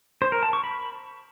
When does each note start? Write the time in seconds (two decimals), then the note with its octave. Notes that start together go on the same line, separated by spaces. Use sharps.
0.22 C5
0.32 A#4
0.43 A5
0.53 C#6
0.64 B5